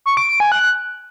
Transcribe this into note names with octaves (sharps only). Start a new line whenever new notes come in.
C#6
D7
D7
G#5
F#6